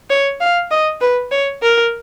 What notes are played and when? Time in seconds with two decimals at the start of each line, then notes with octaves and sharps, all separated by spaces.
0.10 C#5
0.41 F5
0.71 D#5
1.01 B4
1.31 C#5
1.62 A#4